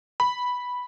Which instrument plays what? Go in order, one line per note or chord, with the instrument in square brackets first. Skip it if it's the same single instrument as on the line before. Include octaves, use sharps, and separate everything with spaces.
[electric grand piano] B5